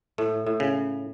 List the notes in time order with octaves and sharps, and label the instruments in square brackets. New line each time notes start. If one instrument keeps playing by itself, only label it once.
[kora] A2 [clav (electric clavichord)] A3
[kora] A2
[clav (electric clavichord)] C#3